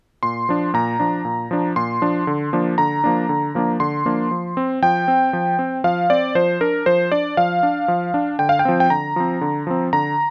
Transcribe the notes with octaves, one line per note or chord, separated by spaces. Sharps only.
A#2 C6
F3 D4
A#2 A#5
F3 D4
A#2
F3 D4
A#2 C6
F3 D4
D3
F3 A#3 D4
D3 A#5
F3 A#3 D4
D3
F3 A#3 D4
D3 C6
F3 A#3 D4
F3
C4
F3 G5
C4
F3
C4
F3 F5
C4 D5
F3 C5
D4 A#4
F3 C5
D4 D5
F3 F5
D4
F3
D4
D3 G5
F5
G5
F3 C4
G5
D3 A#5
F3 C4
D3
F3 C4
D3 A#5